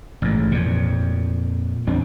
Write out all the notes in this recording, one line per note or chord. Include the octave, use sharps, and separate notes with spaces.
A1 G#2
F2 A#2
E2 C4 D4